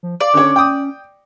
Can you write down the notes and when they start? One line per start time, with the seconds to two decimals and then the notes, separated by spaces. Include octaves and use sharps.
0.03 F3
0.20 D5 F5
0.34 D3 C#4 C#5
0.56 G5 D#6